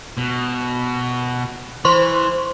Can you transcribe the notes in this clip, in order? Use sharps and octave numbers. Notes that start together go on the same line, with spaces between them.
B2
E3 C5 C6 C#6